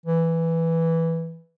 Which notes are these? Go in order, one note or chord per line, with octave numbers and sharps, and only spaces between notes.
E3